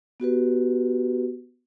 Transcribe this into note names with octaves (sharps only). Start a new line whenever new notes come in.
B3 F#4 G4 B4